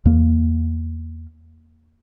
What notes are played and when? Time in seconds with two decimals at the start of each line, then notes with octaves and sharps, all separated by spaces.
0.05 E2 A#3